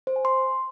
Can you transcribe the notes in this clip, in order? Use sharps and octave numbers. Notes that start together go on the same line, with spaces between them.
C5
G#5
C6